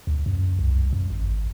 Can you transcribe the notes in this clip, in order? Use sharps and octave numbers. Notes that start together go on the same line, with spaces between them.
D2
F#2
C2
F#2
G#1